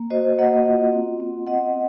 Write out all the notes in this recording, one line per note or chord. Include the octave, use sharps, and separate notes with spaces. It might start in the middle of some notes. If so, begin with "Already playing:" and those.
Already playing: A#3
F#4 C5 D#5
A#3 D#5 F#5
F4
C4
C4
C4 D#5 F#5